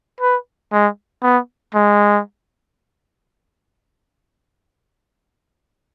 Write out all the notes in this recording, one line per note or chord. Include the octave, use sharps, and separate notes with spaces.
B4
G#3
B3
G#3